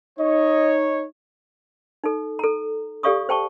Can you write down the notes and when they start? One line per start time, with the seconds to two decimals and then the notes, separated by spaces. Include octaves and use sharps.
0.19 D#4 C#5 D#5
2.04 D#4 A4
2.39 A4 A#5
3.03 G4 A4 D5 F5 C#6 D#6
3.29 C5 G5 A5 C#6